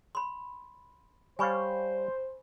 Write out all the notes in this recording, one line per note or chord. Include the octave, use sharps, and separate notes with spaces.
B5 C6
G3 C5 C#5 F5 G#5 B5 C#6